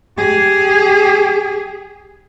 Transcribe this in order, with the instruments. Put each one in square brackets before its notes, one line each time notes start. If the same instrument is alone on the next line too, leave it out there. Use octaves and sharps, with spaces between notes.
[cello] G4 G#4